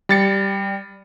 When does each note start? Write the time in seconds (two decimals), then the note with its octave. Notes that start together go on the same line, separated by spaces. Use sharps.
0.09 G3 A6 C#7